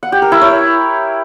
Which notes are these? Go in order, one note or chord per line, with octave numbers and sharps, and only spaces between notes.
F#5
G4
A#4
E4
C#5